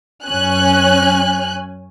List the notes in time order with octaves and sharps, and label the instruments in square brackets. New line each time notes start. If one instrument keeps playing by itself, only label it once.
[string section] F#2 C#4 G#5 F#6